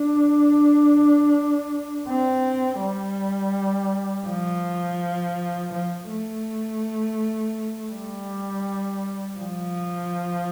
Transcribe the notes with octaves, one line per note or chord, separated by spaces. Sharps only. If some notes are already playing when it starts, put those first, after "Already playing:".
Already playing: D4
C4
G3
F3
F3
A3
G3
F3